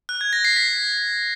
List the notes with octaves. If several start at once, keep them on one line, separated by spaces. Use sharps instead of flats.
F#6
G#6
A#6
C7
B6